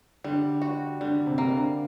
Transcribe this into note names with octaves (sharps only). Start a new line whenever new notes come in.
D3 G3
F#4
D3 G3
C3
A#3
D3